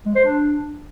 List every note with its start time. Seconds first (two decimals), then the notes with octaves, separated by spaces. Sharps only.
0.06 G#3
0.15 C5
0.25 D4